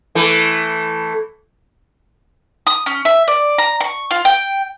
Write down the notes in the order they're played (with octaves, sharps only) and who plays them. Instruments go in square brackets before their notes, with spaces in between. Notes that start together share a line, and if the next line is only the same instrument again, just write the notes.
[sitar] E3 A3
[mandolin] D#6
C#4
E5
D5
A#5
C#6
F4
G5